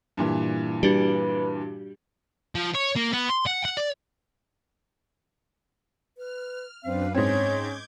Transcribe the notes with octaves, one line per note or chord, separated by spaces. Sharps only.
G2 A#2 E3
G3 D4 F#4 G4 B4
F3
C#5
A#3
B3
C6
F#5
F#5
D5
B4 F6
F#2 C4 D4 B4 F5
G#2 C4 C#4 C#5 D6 G6 G#6